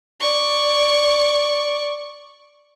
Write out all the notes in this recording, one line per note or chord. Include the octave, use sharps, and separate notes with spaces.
D5 C#6